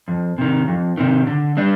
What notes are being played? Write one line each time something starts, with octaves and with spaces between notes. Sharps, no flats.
F2
C3 D#3
F2
C3 D#3
D3
G3 D4